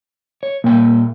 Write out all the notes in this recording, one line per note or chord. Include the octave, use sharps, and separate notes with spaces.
C#5
A#2 G3 A#3 G5